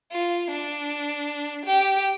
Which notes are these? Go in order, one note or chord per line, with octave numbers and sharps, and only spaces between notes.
F4
D4
G4